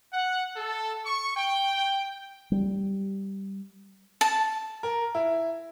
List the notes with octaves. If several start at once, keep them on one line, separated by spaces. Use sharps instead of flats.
F#5
A4
C#6
G5
G3
A5
A#4
E4